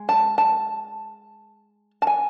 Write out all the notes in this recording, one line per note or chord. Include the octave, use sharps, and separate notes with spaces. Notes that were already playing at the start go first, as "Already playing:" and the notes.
Already playing: G#3
A5
A5
A5
G#5